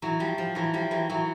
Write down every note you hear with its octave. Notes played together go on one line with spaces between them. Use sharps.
E3 F#3
F3 G3
F3
E3 F#3
F3 G3
E3 F#3
E3 F#3